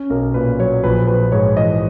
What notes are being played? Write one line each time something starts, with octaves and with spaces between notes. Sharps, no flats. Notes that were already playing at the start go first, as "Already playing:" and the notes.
Already playing: C#4
B1 A#4
A#2 B4
F#3 C#5
A#1 B4
A#1 B4
G#2 C#5
E3 D#5